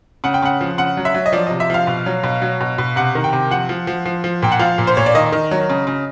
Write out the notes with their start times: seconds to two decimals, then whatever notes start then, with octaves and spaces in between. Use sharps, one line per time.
0.24 C#3 F#5
0.34 G5
0.42 C#3 F#5
0.61 F3
0.78 C#3 F#5
0.97 F#3
1.05 E5
1.14 F#3
1.26 D#5
1.33 F3 D5
1.47 C3 D#5
1.60 E5
1.70 F3 F5
1.87 B2
2.06 F#3
2.23 B2
2.42 F#3
2.61 B2
2.78 B2
2.96 C3 F#5
3.15 D#3
3.24 G5
3.33 C3
3.50 F3 F#5
3.69 F3
3.87 F3
4.06 F3
4.24 F3
4.42 A#2 G5
4.52 F#5
4.60 F3 F5
4.78 A#2
4.87 C5
4.97 A#2 C#5
5.06 D5
5.15 D#3 D#5
5.32 D#3
5.51 F#3
5.70 C#3
5.87 C#3